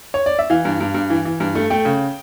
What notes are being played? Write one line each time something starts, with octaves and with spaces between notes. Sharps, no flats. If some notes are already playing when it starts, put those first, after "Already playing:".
C#5
D5
E5
E3 F5
G2
G2
G2
E3
E3
G2
A3
A3 G5
C#3